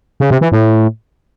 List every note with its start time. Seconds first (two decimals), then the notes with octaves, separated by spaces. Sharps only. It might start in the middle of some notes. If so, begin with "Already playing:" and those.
0.20 C#3
0.31 C3
0.41 E3
0.52 A2